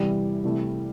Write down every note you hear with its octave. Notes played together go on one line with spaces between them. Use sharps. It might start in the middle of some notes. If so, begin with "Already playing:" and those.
Already playing: E2 C3 E3 G3
C2 C3 E3 A3